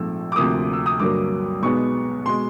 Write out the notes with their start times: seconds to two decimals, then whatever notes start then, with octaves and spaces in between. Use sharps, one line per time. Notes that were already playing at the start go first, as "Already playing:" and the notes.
Already playing: A#1 G#2 F3 A3 C4 E6
0.32 D6
0.36 D2 C3 F3 A#3 D#6
0.73 E6
0.86 D#6
0.99 G2 D3 F#3 A#3 D6
1.63 B1 B2 G#3 B3 C#6
2.26 B2 G#3 C6